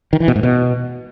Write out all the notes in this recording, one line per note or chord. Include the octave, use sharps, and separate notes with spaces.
D#3
E3
B2
G#2
B2